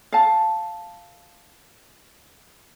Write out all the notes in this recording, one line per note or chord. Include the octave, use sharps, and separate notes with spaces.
F5 A5